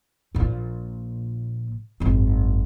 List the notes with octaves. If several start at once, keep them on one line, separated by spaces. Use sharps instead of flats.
A#1 A#2
G#1 F#2